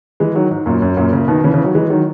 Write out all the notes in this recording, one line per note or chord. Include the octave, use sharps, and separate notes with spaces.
E3 G#3
D#3 F#3
G#2
F#2 A#2
F#2
F#2 A#2
A#2 C#3
B2 D#3
C#3 E3
C#3 E3
D#3 F#3
E3 G#3
D#3 F#3